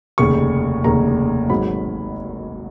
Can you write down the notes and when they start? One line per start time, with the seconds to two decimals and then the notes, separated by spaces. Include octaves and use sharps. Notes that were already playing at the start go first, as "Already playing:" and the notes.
0.18 F1 D#2 C#3 C#6
0.84 F1 D#2 C#3 A#5
1.49 G#1 G#2 F#3 B5